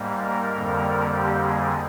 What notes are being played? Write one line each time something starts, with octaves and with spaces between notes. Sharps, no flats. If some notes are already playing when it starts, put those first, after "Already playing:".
Already playing: G#2 G3 A#3
A#4
F2 D3 G3 A#3
G4
G#4